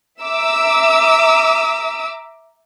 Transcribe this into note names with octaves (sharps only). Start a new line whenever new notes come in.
E5 A#5 D6 E6